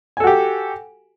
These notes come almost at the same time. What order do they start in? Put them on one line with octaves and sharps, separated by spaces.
G#5 A4 F#4 G4